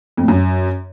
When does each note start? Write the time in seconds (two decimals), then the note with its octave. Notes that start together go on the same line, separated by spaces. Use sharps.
0.17 F2
0.23 A2
0.28 F#2